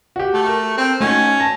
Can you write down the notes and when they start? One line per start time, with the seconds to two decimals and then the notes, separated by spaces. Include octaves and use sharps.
0.16 F#4 G4
0.34 A3
0.46 A#4
0.78 C4
1.00 A3 C#4 D#4 F#4
1.40 A5 A#6